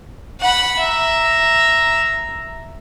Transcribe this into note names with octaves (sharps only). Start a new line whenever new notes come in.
F#5 B5
E5 A#5